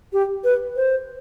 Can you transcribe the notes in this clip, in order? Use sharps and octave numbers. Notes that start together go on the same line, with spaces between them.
G4
B4
C5